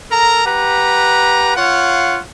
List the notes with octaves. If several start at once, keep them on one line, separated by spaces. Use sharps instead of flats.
A4 A#4 A#5
G4 B4 F#5 A#5
F4 C#5 F5 F#5